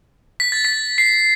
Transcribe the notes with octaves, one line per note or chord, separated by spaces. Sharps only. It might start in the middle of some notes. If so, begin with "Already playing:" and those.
B6
A6
B6
C7